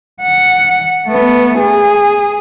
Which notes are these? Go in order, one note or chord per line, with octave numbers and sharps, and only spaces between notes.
F#5
A3 B3
G#4